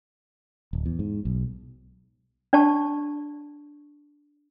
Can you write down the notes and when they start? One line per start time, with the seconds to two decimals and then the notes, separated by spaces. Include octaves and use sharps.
0.73 D1
0.86 E2
0.99 G#2
1.25 B1
2.53 D4 D5 A5 C#6